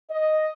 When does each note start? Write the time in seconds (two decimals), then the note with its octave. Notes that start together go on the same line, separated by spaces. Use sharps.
0.10 D#5